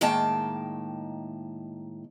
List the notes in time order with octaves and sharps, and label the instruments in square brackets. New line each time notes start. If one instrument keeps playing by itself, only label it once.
[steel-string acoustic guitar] A2 D#3 G#3 A#3 G5 A5